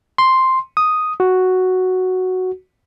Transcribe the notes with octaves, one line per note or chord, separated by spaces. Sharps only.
C6
D#6
F#4